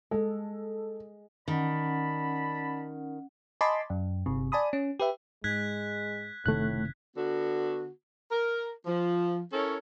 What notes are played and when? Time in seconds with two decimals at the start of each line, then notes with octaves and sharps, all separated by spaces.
0.11 G#3 A4
1.48 D#3 C#4 D5 F#5 A5 B5
3.61 D#5 G#5 A5 B5 C6 D6
3.90 F#2
4.26 G1 C3
4.52 D5 G#5 A5 B5 D#6
4.73 C#4
5.00 G4 B4 E5
5.44 G#2 G#3 F#6 G#6 B6
6.46 F#1 A2 C3 D#3 A3 F#6
7.16 D3 B3 F#4
8.31 A#4
8.86 F3
9.53 C#4 E4 A4 A#4 C#5